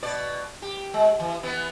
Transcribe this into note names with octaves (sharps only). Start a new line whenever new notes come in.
B2 D5
G4
G#3
E3
E3 B3